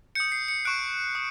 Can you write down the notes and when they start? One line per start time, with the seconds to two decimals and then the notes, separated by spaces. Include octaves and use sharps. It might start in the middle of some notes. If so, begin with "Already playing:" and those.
0.15 D#6 G6 C#7
0.32 C7
0.48 C#7
0.65 C#6 F#6 D7
1.15 D#6